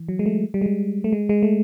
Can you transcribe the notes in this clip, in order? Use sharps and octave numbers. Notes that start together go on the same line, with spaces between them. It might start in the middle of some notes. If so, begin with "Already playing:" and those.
Already playing: E3
F#3
G#3
A3
G3
G#3
G3
A3
G#3
G#3
A3